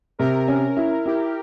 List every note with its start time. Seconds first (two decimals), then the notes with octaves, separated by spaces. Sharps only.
0.19 C3 A#4
0.48 C#4
0.77 E4
1.06 E4 G4